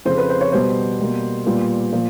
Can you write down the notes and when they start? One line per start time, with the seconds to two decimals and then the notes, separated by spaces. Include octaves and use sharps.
0.05 F2 C#3 F3 C5
0.18 B4
0.30 C5
0.41 C#5
0.52 B2 G3 B3 C5
0.99 B2 G3 A#3
1.46 A#2 G3 B3
1.92 A#2 F3